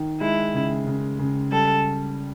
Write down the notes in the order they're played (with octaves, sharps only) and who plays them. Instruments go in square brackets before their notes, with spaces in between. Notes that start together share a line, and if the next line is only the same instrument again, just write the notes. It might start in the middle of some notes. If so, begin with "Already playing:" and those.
Already playing: [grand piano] D#3
[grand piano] G#3 [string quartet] E4
[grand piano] C#3
C#3
C#3
[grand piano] G3 [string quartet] A4